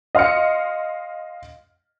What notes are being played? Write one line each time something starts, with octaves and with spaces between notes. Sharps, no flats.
D#5 F5 C6 F6 C#7